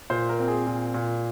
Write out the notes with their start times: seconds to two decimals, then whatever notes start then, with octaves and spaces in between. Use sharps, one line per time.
0.10 A#2 C5
0.29 A#4
0.39 C4
0.48 G#4
0.67 A#2
0.94 A#2